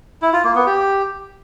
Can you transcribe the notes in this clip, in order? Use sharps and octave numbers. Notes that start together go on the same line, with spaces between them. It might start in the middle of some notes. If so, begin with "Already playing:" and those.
E4
F4
A#3
B3
G4